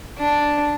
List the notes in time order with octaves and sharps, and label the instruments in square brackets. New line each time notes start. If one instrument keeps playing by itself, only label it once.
[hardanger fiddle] D4